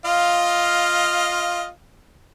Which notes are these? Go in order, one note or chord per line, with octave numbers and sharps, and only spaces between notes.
F4 D#5 F5